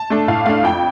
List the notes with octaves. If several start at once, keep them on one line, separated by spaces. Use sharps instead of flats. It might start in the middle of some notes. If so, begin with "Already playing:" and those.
Already playing: A5
A3 D4
A2 F5
A3 D4 F5
F2 G5